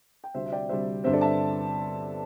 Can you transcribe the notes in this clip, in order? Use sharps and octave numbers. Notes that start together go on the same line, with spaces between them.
G5
D2 C3 G3 C4 C5 E5
E5
D5 G5
D2 C3 G3 C4 C5 E5
G1 G2 D3 G3 C4 C5 E5
A4 D5
E5 A5